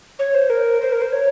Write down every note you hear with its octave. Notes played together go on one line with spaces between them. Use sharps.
C#5
C5
A#4
C5
A#4
C5
C#5